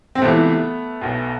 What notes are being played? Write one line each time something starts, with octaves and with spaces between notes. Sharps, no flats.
C4
C#2 C3 E3 A3 B3
B1 B2